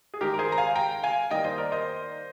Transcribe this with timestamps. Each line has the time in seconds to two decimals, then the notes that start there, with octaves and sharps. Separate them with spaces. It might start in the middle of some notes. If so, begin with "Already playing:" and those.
0.14 G#4
0.21 D#3 G#3 G4 A#4
0.34 A#4
0.39 G#4 C5
0.52 A#5
0.58 F5 G#5
0.76 G5 A#5
1.03 F5 G#5
1.31 D#3 G3 A#3 D#5 G5
1.44 C5 D#5
1.58 A#4 D5
1.72 C5 D#5